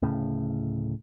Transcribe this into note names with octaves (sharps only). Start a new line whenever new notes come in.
D1 A2 C#3